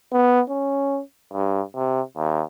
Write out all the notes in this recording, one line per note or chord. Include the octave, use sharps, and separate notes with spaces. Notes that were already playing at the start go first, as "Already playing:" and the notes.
B3
C#4
G2
C3
D#2